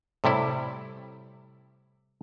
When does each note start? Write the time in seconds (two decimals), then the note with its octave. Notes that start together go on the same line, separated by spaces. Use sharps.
0.24 A2 C3 G3 E4